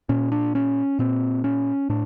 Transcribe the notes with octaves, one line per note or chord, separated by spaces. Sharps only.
A#2 C#4
D4
C#4
A#2 C4
C#4
A2 D4